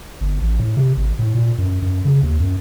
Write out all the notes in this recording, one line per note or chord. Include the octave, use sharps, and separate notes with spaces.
G1
A1
A2
C3
G#1
A2
A#2
F#2
F#2
C#3
D#2
F#2